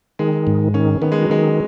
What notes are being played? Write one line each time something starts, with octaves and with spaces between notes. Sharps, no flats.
D#3 G#3
G#2
D#3 C#4
D#3 B3
G#3
F#3
D#3 G#3